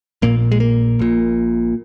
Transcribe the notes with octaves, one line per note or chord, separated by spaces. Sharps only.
A#1 A#2 A#3
G#3
A#3
A#1 A#2